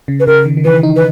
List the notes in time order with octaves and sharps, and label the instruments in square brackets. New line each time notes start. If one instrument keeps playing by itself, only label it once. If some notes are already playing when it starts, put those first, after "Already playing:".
[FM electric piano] C#3
[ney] B4
[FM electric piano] C#3 [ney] A#4
[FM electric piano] D#3
D#3
[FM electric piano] E3 [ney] B4
[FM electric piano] D#4
[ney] B4